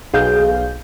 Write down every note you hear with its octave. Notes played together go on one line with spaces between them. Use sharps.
B1 G#4 F5 G6